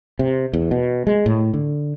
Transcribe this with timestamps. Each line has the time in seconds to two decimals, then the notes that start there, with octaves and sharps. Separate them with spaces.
0.19 C3
0.53 E2
0.71 B2
1.07 G#3
1.26 A2
1.54 D3